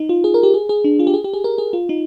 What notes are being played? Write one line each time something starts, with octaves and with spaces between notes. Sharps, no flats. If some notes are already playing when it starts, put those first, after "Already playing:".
Already playing: D#4
F4
G#4
A#4
G4
G#4
G#4
D4
F4
G4
G#4
G4
G#4
A#4
G#4
F4
D#4